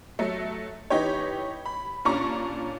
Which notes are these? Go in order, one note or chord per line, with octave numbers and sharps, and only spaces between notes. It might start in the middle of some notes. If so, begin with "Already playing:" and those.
F#3 A3
E3 D#4 G4 C#5
B5
A#2 C#4 D4 A#5 C#6